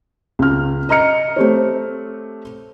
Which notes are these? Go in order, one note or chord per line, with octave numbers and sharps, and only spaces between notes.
C#2 F6
D#5 A#5 F6 C#7
A3 C4 G4 C#5